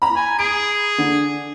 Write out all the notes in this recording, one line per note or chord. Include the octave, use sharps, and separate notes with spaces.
A#5 B5
G#5
G#4 D7
D3